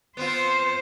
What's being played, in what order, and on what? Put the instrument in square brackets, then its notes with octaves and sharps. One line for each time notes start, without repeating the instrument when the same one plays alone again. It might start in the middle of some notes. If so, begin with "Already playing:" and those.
[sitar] B3 C4 F4 [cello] C5